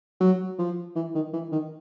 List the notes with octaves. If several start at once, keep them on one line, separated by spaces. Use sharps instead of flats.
F#3
F3
E3
D#3
E3
D#3